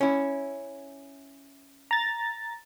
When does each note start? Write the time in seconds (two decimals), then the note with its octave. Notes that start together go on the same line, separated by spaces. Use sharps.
0.01 C#4 E4
1.91 A#5 A6